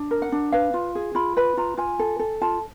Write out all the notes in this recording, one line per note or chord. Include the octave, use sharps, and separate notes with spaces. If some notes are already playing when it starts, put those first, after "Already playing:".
Already playing: D4
A#4
F#5
D4
B4 F5
F4
G#4
F4 B5
B4 B5
F4 A#5
F4 G#5
A4
A4
F4 A5